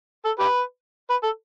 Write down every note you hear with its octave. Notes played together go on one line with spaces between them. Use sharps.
A4
G4 B4
B4
A4